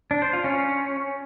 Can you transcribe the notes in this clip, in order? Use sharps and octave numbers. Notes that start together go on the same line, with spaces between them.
D4
C5
F4
C#4